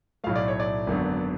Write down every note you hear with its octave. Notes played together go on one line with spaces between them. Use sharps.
B1 A2 F#3 A3 F5
D5
C#5
D5
G#1 F#2 D3 F#3 B3